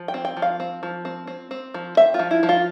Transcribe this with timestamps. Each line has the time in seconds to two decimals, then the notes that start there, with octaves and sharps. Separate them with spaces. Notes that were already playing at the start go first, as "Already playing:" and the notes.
Already playing: F3
0.08 G5
0.14 C4
0.25 G5
0.37 F3
0.42 F5
0.60 C4
0.83 F3
1.05 C4
1.27 C4
1.51 C4
1.74 F3
1.97 C4 E5
2.14 F4
2.19 F3
2.31 E4
2.43 F3
2.49 F4